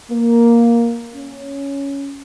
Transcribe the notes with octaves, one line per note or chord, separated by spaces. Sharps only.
A#3
C#4